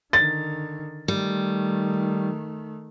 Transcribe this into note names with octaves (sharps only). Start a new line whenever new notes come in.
D3 D#3 A6
D#3 G3 A3